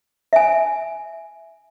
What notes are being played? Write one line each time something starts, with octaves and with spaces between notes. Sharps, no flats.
E5 G#5